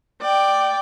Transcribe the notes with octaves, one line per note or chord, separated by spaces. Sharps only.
D5 G5